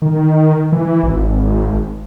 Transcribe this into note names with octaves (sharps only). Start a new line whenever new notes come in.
D#3
E3
G#1